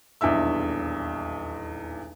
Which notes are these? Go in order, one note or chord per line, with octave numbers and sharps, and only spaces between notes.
D#1 B1 E2 D4 E5 E6